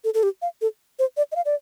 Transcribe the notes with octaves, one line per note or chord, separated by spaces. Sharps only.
A4
A4
G4
F5
A4
C5
D5
D#5
F5
D5